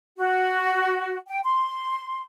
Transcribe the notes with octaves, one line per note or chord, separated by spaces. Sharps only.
F#4
G5
C6